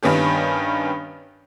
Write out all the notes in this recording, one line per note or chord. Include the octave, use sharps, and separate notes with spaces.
G2 D#3 B3 C#4 G4